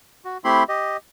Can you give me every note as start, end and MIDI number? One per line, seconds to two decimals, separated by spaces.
0.25 0.38 66
0.44 0.63 57
0.44 0.63 60
0.44 0.63 64
0.44 0.63 67
0.44 0.63 83
0.44 0.63 84
0.69 0.97 67
0.69 0.97 75